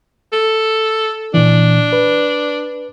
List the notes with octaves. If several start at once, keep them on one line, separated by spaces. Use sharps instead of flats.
A4
A#2 E3 D4
B4